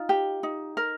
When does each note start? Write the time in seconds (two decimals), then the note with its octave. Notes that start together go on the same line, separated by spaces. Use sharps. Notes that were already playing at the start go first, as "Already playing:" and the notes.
Already playing: D#4 F4
0.09 G4
0.43 D#4
0.77 A#4